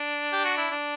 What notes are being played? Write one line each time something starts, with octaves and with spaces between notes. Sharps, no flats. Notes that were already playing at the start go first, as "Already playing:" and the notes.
Already playing: D4
G4
F#4
E4
D4